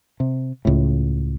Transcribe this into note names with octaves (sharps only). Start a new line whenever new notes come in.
C3
C#2 A2